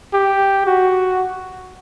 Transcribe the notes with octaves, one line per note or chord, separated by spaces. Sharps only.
G4
F#4